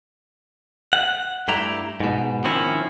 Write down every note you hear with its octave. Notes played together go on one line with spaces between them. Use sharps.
F#5
G2 A3 E4 G4 A#5
G#2 B2
D#3 F3 C4 C#4 E4